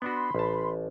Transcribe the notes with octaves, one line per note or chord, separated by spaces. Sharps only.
B3 D4 F#4 B5 C6
A1 A5